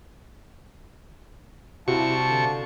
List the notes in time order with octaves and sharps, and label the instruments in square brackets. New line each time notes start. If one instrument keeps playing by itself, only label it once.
[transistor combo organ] C3 C#6 [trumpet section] G3 F5 A5 [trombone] E4 [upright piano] F#4
[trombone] D3